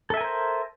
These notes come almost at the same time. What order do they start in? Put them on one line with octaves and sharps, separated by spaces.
A4 E5 G#5 A#4 C5